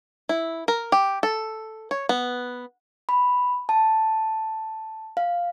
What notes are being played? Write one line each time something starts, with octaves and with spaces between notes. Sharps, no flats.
E4
A#4
G4
A4
C#5
B3
B5
A5
F5